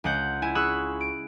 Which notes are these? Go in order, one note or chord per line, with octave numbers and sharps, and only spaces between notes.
C#2 G#3 F#5 G6
E4 G#5
G#4 B5 C#6 E6 F#6
D7